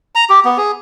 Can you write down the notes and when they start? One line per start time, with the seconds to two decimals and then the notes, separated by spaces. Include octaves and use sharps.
0.15 A#5
0.30 G4
0.45 B3
0.58 G#4